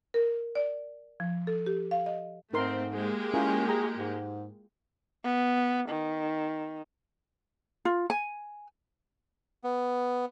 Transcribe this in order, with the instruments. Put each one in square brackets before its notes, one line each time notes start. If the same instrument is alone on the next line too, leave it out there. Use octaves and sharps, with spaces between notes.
[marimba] A#4
D5
F3
A4
G4
F5
D#5
[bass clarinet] G#2 [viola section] A3 C4 [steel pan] D#4 A#4 C6
[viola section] G#3 A#3 G4
[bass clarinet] C#4 [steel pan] E4 F4 A#4
[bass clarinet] G#4 [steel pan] G5 A#5
[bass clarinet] G#2
[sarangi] B3
D#3
[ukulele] F4
G#5
[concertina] B3